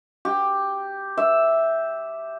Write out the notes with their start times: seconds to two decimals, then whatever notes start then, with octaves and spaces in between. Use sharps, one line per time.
0.25 G4
1.17 E5